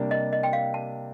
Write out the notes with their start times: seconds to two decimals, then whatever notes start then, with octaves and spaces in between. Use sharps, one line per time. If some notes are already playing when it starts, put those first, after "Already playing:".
Already playing: C3 G3 A#3 D4
0.11 D#5
0.33 D#5
0.43 G5
0.53 F5
0.74 A5